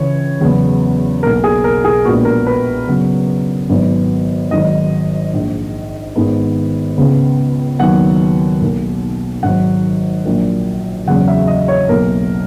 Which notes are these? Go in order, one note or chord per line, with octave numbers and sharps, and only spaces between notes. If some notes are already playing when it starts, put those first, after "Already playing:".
Already playing: C#2 C#3 E3 C#5
E2 C#3 F#3 B3
B1 B2 A#3 A#4
G#4
A#4
G#4
A#1 A#2 G#3 B3 F#4
A#4
B4
F#2 C#3 F#3 B3
G#1 G#2 F#3 B3
G#1 G#2 D#3 F#3 D#5
A#1 G#2 D#3
G#1 G#2 D#3 G#3 B3
C#2 C#3 G#3 B3
D#2 D#3 F#3 B3 F#5
B1 B2 A#3
G#1 G#2 F#3 F#5
A#1 A#2 F#3
F#1 E2 C#3 F#3 F#5
E5
D#5
C#5
B1 B2 F#3 A#3 A#4